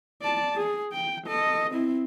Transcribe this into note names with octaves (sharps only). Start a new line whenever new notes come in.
D5 A5
G#4
G5
A4 D#5
C4 E4